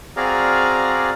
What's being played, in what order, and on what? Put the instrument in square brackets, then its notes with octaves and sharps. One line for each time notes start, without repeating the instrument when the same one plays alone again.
[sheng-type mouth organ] C4 F#4 G#4 D5 F5 A#5